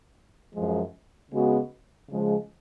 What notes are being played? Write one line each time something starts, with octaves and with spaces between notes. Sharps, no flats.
F#2 F3 G#3
C#3 G#3 B3 F#4
C#3 F3 G#3